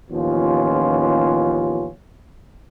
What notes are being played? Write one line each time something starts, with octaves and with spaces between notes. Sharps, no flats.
A1 D#2 F3 B3 C#4 F4